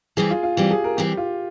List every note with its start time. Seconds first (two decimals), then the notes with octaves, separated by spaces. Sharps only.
0.17 E3 G3 C4 G#4
0.30 F4
0.43 F4
0.57 E3 G3 C4 G4
0.71 G#4
0.84 A#4
0.97 E3 G3 C4 G4
1.17 F4